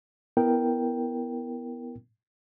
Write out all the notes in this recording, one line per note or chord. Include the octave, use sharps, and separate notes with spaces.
B3 E4 A#4 G5